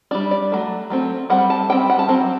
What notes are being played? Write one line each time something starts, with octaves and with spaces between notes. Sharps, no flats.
G3 D4 D5
D5
F#3 A3
F#3 A3 C4
G3 C4 F#5
A5
G3 C4 G5
F#5
A5
F#3 C4